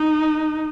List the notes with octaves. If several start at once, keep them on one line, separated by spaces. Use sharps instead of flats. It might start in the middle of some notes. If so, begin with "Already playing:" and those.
Already playing: D#4